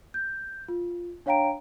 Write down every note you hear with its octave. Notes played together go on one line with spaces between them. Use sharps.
G6
F4
D4 C#5 F5 G5 A#5 D7